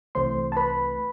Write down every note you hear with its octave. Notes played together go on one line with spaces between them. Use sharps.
C2 C3 E3 A3 C5 C6
A5
B4 B5